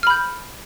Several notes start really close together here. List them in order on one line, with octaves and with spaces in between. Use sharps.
F6 B5 G6